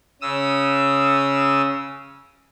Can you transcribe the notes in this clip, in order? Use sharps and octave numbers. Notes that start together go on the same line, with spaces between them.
C#3 D#6 E6